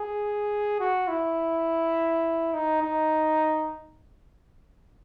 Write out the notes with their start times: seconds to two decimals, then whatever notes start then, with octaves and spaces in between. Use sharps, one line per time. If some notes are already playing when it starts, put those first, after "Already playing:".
Already playing: G#4
0.80 F#4
1.08 E4
2.54 D#4
2.82 D#4